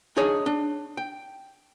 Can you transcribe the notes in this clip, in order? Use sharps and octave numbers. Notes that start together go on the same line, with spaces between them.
D4 D#4 G#4 C#5 D#5
D4
G5